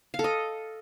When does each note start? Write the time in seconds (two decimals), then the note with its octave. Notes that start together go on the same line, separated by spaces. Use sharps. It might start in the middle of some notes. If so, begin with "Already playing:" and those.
0.14 F5
0.19 A4
0.24 D#5